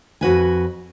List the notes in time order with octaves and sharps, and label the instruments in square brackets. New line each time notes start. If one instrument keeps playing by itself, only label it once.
[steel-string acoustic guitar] F2 F#4 B4 G#5